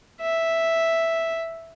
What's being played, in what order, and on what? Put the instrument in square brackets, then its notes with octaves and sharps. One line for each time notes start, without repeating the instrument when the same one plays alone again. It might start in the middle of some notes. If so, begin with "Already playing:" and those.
[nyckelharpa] E5